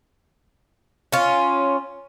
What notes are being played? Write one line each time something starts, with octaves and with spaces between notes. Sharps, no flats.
C#4 F4